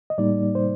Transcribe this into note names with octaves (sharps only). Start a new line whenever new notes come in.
D#5
A2 G3 A#3 D#4 D5
C5